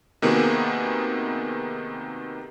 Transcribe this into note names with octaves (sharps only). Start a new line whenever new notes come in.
C3 D#3 A#3 B3 F#4 G#4